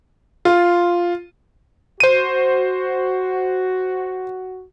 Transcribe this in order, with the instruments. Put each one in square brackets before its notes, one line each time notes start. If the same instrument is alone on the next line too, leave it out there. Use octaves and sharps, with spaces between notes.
[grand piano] F4
[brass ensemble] F#4 [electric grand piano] C5 D#7